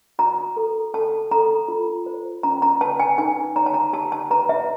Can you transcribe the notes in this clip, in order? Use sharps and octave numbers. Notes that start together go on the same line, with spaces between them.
F#4 A#5
A4
A4 A5
A4 A#5
F4
C5
C#4 A#5
A#5
B4 A5
G#5
D#4 G#5
C#5 A#5
A5
A#5
G4 A5
A5
B4 A#5
E5